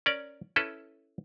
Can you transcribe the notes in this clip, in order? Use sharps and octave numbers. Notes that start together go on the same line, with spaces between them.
C#4 A#4 D5
C#4 E4 A4 B4